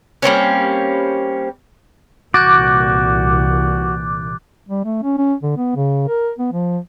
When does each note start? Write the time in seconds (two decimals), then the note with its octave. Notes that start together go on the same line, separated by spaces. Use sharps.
0.22 G3 A#3 C4 C#4
2.34 C2 A#2 E3 F#4 D6 F#6 G6 A6
4.69 G3
4.85 A3
5.03 C#4
5.18 C#4
5.43 D3
5.57 B3
5.76 C#3
6.08 A#4
6.39 B3
6.53 F3